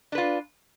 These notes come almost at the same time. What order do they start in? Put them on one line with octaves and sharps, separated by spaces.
D4 B4 F4